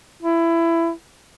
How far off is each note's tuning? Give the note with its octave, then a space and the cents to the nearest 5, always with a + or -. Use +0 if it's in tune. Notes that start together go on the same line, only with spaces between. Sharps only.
E4 +20